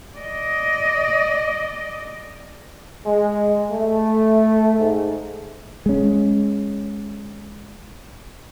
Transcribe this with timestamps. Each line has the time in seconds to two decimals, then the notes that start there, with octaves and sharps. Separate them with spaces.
0.18 D5 D#5
3.06 G#3
3.69 A3
4.79 G#2
5.86 G#3 C#4